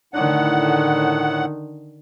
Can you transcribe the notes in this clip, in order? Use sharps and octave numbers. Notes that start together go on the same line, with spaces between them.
A2 D3 D#3 F#5